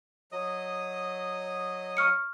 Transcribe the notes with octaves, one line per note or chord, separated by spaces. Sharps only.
F#3 D#5 D#6
C#6 F6 C#7